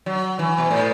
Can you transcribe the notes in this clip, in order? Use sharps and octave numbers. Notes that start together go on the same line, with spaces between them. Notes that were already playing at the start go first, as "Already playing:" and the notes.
F#3
E3
B2
A2